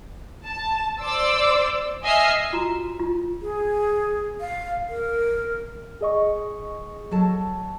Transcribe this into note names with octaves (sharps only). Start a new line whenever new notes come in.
A5
C5 D5 C6 D6 E6
D#5 E5 G#5 D#6 F6 C7
F4 F#4 A#5
F4
G#4
F5
A#4
G#4 D#5 C#6
F#3 A4 A5